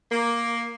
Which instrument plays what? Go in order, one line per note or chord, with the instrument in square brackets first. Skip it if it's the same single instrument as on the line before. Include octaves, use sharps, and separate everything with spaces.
[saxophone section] A#3